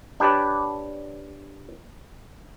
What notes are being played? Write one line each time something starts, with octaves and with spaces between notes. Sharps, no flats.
D4 G4 B4 C#5 D5